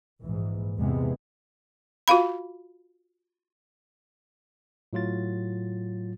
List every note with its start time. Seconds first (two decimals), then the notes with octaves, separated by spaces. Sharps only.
0.22 A#1 G#2 E3
0.80 E2 C3 E3 G#3 B3
2.08 F4 F#4 F5 B5
4.93 A2 F#3 F4 A6